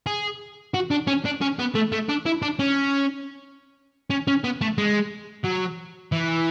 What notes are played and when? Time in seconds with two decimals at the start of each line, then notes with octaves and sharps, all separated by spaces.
0.06 G#4
0.74 F#4
0.91 D4
1.07 C#4
1.25 D4
1.41 C#4
1.59 B3
1.75 A3
1.92 A3
2.09 D4
2.26 E4
2.42 D4
2.59 C#4
4.10 C#4
4.27 C#4
4.44 B3
4.61 A3
4.78 G#3
5.45 F#3
6.12 E3